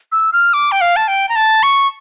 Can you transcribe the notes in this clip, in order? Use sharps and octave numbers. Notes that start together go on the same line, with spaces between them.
E6
F6
D6
G5
F5
A5
G5
A#5
A5
C#6